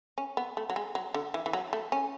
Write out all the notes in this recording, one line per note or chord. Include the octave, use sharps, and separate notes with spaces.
C#4
B3
A3
F#3
G#3
F#3
D3
E3
E3
F#3
A3
C#4